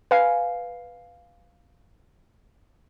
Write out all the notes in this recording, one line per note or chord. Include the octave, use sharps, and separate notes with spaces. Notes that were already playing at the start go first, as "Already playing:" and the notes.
B4 F5 G#5 C7